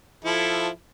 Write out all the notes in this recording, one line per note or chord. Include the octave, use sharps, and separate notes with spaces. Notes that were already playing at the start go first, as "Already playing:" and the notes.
F3 E4 A4